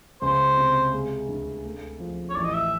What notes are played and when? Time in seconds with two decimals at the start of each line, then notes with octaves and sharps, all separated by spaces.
0.22 C#2 C5
0.57 C3
0.93 G#3
1.28 D2
1.65 A3
2.00 F3
2.30 C#5
2.35 A1 D5
2.45 D#5
2.54 E5